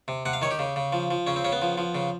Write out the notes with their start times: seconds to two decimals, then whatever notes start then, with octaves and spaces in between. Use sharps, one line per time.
0.08 C3
0.26 C3 F#5
0.33 F5
0.42 D#3 C#5
0.51 G4
0.59 C#3
0.76 C#3
0.93 F3
1.11 F3
1.27 C#3 C#4
1.36 C4
1.44 C#3 C#4
1.52 B3
1.62 F3
1.78 F3
1.95 C#3